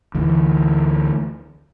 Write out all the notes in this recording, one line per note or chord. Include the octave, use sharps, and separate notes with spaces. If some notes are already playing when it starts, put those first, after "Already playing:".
D2 E3